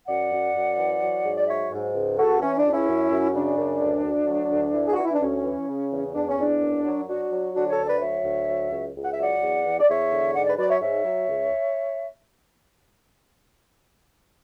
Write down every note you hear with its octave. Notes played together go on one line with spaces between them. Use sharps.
F#2 D5 F#5
F#2
F#2
E3
F#3
G#2
D5
F#3 C#5 E5
G#2
C#2
C#2 F#4 A4
E3 C#4
D4
C#2
C#4 E4
F#2
F#2
C#3 D4
F#2
D2
D2
F#3
D2
E3
G#4
F#4
E3
E4
D4
D2 C#4
E3
C#3
E2
E2 D4
C#4
E2 D4
F#2
F#3
F#3 D4 F#4
F#3
D3 D4 F#4
A4 C#5
D2
B4 D5
F#3 C#5 E5
D2
F#3
C#2
C#2
F#5
E5
F#3 D5 F#5
E2
E2
D5
E2 C#5 E5
D3
G#2 D5 F#5
B4 D5
F#3 B4 D5
C#5 E5
G#2 C#5 E5
F#3
C#2